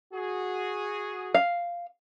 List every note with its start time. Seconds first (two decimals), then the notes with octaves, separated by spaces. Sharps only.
0.14 F#4 G#4
1.34 F5